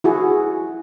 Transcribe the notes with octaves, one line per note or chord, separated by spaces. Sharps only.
E4 F#4 G#4